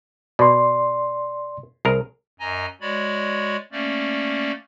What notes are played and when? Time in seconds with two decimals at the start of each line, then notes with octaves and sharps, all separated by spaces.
0.39 B2 D5 C6
1.85 C2 G#4 A#4
2.40 F#2 D#5 G#5 A#5
2.81 G#3 F#4 C#5 D5 B5
3.72 A3 A#3 C#4 D5